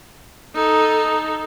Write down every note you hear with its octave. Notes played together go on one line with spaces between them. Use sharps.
D#4 A4